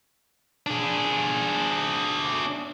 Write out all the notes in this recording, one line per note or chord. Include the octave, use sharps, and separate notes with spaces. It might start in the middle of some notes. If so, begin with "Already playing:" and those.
D4 G#4